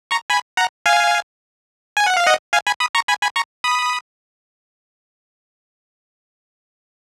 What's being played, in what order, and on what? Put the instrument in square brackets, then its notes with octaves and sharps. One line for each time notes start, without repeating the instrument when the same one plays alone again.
[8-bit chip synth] A#5 C#6
G#5 B5
F#5 A#5
F5 G#5
G#5
F#5
F5
D#5 F#5
F5 G#5
G#5 B5
B5 D#6
A#5 C#6
G#5 B5
G#5 B5
A#5 C#6
B5 D#6